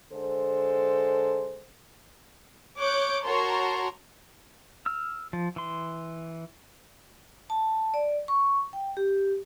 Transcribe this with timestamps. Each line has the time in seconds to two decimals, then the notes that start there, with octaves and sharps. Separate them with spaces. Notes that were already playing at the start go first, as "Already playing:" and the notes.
0.12 D3 G#3 A4 C5
2.79 C#5 D6 F#6 G6 D7
3.24 F#4 A#4 C#5 A5 A#5 C6
4.86 E6 F6
5.33 F3
5.56 E3 C6
7.50 A5
7.94 D5
8.28 C#6
8.73 G5
8.97 G4